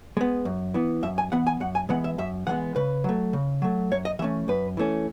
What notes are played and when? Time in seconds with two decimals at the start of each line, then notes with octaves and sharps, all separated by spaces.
0.17 G#3 B3
0.45 F#2
0.74 E3 B3
1.03 F#2 E5
1.18 G#5
1.32 E3 B3 F#5
1.47 G#5
1.60 F#2 F#5
1.75 G#5
1.89 E3 G#3 B3 F#5
2.04 E5
2.18 F#2 E5
2.47 E3 G#3 B3 F#5
2.76 C#3 B4
3.04 F#3 A3
3.33 C#3
3.62 F#3 A3
3.91 F#2 C#5
4.05 D#5
4.19 E3 A3 C#4 E5
4.48 F#2 B4
4.77 E3 A3 C#4